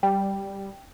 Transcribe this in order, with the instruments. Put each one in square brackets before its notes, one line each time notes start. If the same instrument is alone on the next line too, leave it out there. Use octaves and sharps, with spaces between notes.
[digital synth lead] G3 [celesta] G5